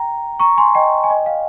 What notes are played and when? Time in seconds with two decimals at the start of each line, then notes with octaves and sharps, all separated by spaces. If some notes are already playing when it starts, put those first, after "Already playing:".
Already playing: G5 A#5
0.40 A#5 C#6
0.57 G#5 C6
0.75 D#5 G5
1.04 G#5
1.10 D#5 G5
1.26 F5